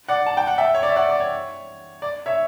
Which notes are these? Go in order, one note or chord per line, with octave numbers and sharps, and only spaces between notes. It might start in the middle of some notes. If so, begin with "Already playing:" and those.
D5 F#5
A5
G5
F#5
E5 G5
C#5
D5
E5
D5 F#5
D5
C#5
D5
C#5 E5